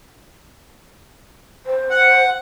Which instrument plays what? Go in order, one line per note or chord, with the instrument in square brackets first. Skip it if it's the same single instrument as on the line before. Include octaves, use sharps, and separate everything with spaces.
[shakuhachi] C5
[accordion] F#5